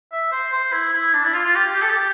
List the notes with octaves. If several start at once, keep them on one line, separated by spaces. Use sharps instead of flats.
E5
C5
C5
E4
E4
D4
E4
F4
F4
G4
G4
A4
G4